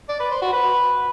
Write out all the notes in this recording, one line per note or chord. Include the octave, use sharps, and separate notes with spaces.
D5
B4
C5
F#4
B4